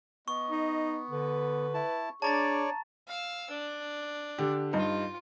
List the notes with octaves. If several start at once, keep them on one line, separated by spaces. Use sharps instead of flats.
B3 D#5 C#6
D#4
D3 B4
E4 A5
D4 G#4 C#5 D5 A5 A#5 A6
F5 E6
D4
D3 G4
G2 D#4 F4